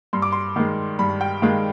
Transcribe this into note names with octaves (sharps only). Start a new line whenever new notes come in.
G2 C6
D6
C6
D#3 G#3
G2 B5
G5
D#3 G#3 F5